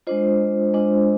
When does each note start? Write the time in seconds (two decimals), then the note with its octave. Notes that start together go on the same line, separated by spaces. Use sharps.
0.07 G#3 D4 F4 C5 D#5
0.74 G#3 D4 F4 C5 D#5